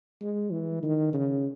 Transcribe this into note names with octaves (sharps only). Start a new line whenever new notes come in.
G#3
E3
D#3
C#3